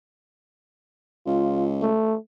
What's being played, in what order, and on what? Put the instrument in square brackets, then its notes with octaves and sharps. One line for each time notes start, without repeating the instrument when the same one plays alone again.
[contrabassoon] C#2 [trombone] F4
[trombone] A3